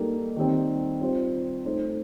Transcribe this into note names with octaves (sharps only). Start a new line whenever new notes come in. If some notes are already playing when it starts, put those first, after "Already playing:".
Already playing: G3 A#3 D#4 A4
D#3 G3 C4
G3 C4 F4 C5
A3 D#4 A4 C5